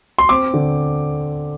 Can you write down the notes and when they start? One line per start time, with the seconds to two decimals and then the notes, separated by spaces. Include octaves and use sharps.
0.19 C6
0.29 C4 D6
0.54 D3